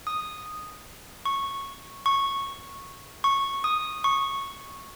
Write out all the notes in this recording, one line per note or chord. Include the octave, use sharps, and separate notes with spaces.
D#6
C#6
C#6
C#6
D#6
C#6